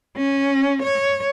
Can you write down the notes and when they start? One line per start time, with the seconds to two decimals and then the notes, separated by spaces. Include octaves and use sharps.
0.17 C#4
0.83 C#5